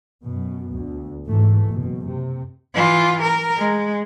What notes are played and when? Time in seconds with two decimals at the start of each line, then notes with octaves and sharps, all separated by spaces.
0.24 F#2 B2
0.75 D2
1.28 G#2 B2 E3 A3
1.67 F#1 F#2 B2
2.05 C3
2.75 E3 F4
3.22 A#4
3.57 G#3